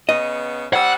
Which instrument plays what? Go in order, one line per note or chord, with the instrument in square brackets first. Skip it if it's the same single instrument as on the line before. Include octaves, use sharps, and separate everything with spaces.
[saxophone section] C#3 B3 [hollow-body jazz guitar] D#5
[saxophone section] G3 C4 D5 [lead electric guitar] F#5